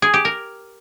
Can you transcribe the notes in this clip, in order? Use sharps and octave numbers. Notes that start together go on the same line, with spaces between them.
G#4
G4
A#4